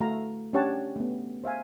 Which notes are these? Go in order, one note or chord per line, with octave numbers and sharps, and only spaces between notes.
A3 F#4 F5 A#5
C#4 D4 G4 C#5 F#5 A5
A3 B3
C5 E5 F5 G#5